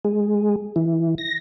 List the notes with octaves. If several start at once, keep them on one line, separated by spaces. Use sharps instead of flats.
G#3
E3
A#6